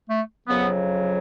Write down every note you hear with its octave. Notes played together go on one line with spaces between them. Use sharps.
A3
F2 C#3 F#3 B3